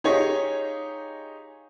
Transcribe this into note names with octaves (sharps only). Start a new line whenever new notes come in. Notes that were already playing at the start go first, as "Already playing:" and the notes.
D#4 F4 G4 G#4 C#5 D#5